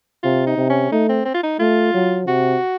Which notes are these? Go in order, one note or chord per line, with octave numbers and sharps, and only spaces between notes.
C3 F4
D#4
C3
C#4
A3 D#4
C4
C4
F4
D#4
A3 F4
F#3
C3 F#4